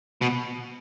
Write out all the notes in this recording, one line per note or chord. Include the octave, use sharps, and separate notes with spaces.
B2